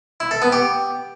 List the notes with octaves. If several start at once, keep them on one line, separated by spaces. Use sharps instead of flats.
E4
A4
B3
G4